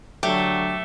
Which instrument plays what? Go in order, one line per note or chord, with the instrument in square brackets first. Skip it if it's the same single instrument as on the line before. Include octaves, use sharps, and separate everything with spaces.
[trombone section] D3 F#3 [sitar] A3 [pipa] G4